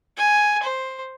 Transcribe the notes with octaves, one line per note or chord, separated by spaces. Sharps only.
G#5
C5